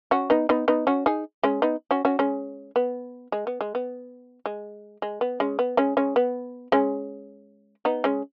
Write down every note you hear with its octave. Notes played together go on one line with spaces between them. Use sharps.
C#4 F#4
B3 D#4
B3 D#4
B3 D#4
C#4 F#4
D#4 G#4
G#3 C#4
B3 D#4
C#4 F#4
C#4 F#4
G#3 C#4
B3
G#3
B3
G#3
B3
G#3
G#3
B3
G#3 C#4
B3
G#3 C#4
G#3 C#4
B3
G#3 C#4
B3 D#4
G#3 C#4